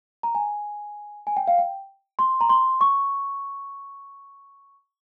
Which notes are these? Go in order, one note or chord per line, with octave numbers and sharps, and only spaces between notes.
A#5
G#5
G#5
G5
F5
G5
C6
A#5
C6
C#6